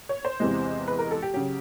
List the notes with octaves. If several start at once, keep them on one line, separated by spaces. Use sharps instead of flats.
C#5
C5
E2 C3 E3 G#3
B4
A#4
A4
G4
C#3 F#3 G4